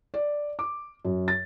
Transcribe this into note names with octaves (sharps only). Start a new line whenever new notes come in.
D5
D6
F#2
A6